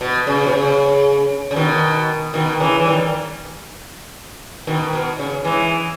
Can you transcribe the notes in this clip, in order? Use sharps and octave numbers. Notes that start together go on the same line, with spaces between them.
B2
C#3
B2
C#3
C#3
B2 D#3
B2 D#3
C#3 E3
E3
D#3 G3
B2 D#3
B2
C#3
E3 G#3